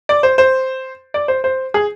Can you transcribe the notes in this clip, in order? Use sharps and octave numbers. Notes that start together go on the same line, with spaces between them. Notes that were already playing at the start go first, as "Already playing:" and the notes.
D5
C5
C5
D5
C5
C5
G#4